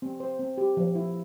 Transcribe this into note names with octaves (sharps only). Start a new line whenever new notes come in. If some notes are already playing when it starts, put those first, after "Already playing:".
C4
C5
C4
G4
F3
E4